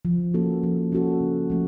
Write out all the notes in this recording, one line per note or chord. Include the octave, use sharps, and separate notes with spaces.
F3
A#3 C#4 F#4 A4
F3
A#3 C#4 F#4 A4
C#3
F3 A3 C#4